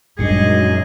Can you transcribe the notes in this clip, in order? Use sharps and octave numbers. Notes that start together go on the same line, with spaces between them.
F#2 A#2 G3 G#3 D4 D#4 G#4 D#5